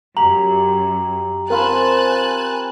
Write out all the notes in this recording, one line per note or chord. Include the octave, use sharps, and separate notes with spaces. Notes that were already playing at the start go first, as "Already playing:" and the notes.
F#2 G4 A#5 F#7
C4 F4 A#4 G#5 A5 B5 F#6